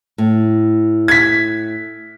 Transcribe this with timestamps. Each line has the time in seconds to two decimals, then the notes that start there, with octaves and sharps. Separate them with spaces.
0.18 A2
1.08 G#6 B6